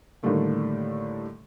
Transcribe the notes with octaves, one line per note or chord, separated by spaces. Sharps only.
A2 D3 D#3 G3 A3 A#3